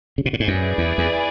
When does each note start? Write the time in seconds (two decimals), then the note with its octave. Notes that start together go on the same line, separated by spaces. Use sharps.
0.18 C#3
0.26 B2
0.33 A2
0.40 G#2
0.48 F#2 E4 G#4 B4 D5
0.78 E2
0.98 E2